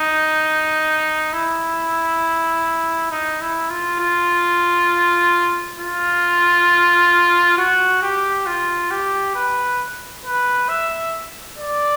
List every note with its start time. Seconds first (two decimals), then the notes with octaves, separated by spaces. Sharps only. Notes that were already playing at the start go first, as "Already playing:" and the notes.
Already playing: D#4
1.33 E4
3.11 D#4
3.41 E4
3.70 F4
4.00 F4
5.79 F4
7.58 F#4
8.02 G4
8.47 F4
8.91 G4
9.35 B4
10.25 B4
10.69 E5
11.58 D5